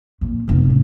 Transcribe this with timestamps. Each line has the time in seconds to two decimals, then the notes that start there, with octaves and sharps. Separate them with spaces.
0.21 F2 A#2
0.48 F1 E2
0.66 A2 C#3